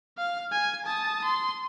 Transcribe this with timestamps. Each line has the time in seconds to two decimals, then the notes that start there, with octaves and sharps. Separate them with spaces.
0.18 F5
0.52 G#5
0.85 A5 D#6
1.24 C6